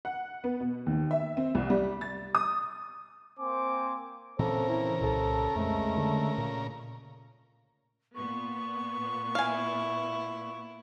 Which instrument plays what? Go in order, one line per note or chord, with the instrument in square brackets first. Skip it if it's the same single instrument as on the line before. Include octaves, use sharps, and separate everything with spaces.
[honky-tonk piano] F#5
B3
B2
D#2
E5
C4
C2
G3
A6
D#6
[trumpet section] A#3 C4 C5 G#5 D6
[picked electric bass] A#2 E3 C4 [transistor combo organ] C#3 A#4 [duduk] A4 [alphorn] C5
[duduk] E4
[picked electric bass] C2 A#2 [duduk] A4
[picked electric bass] F2 [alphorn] G#3 [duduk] A3
[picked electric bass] D3
A#2
[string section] A#2 B3 [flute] C#6
[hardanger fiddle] E4 [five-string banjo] F5 G#5